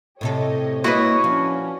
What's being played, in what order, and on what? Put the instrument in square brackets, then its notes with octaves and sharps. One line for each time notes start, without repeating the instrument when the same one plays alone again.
[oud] A2 C3 A4 [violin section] G4 C#5 D#5
[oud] A#3 D#5 [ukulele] E4 B4 [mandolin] F#4 [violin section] C#5
[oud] F3 [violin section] C#4 D4